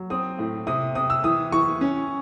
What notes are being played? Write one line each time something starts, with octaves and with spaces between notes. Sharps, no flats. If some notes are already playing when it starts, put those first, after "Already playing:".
Already playing: F#3
C4 D#6
A2
C3 D#6
C3 D#6
E6
E3 D#6
E3 C#6
C#4